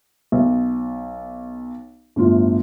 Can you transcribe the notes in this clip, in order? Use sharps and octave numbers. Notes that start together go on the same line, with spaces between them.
B1
G1 A2 F4